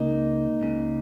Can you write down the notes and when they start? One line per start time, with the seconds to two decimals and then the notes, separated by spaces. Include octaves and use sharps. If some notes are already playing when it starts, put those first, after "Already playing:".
Already playing: C#2 C#3 A#3 D#4
0.62 C#2 C#3